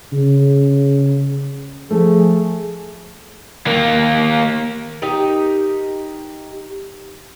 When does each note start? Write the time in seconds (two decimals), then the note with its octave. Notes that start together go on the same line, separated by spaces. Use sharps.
0.12 C#3
1.91 F3 A3 G#4
3.66 D#2 A#3
5.02 D#4 G4 A#4